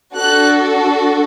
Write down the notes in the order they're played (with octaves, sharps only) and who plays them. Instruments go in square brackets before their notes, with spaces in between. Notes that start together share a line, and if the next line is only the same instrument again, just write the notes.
[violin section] D4 F#4 A4 F#6